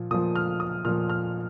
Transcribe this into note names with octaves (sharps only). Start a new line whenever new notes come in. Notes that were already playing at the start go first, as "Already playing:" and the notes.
Already playing: A#2 F3
A#2 F3 D#6
F6
D#6
A#2 F3 F6
F6